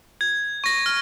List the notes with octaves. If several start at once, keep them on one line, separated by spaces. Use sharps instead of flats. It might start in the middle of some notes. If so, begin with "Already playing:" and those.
G#6
C#6 A#6
F6